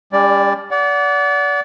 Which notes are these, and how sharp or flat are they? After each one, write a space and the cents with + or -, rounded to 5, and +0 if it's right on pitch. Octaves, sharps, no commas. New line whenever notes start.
G3 +35 C#4 +45 D5 +0
D5 -30 F#5 -5